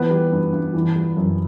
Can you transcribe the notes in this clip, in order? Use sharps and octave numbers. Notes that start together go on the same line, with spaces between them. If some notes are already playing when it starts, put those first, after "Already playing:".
Already playing: E3 B3 B4
G3
G2
G2
E3
G3
F#2